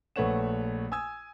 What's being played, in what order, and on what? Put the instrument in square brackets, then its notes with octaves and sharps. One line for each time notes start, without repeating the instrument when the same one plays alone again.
[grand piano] A#1 A3 B4 C#5 F#5 E7
G#5 D#6 E6 G#6